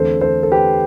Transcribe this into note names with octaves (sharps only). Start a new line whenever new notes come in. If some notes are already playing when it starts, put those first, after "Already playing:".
Already playing: E2 D3 A3 C4 A4 C5
A4 C5
A4
G4 B4